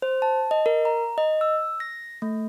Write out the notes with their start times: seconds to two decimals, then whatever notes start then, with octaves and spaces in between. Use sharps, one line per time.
0.02 C5
0.22 A5
0.51 D#5
0.66 A#4
0.85 A#5
1.18 D#5
1.41 E6
1.80 A#6
2.22 A3